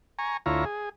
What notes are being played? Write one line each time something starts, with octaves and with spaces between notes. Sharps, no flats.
G#5 A#5 C#6
D2 E4 F4 C#5 A#5
G#4